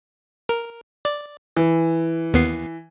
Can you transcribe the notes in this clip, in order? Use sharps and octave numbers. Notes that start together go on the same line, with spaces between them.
A#4
D5
E3
D#2 B3 C7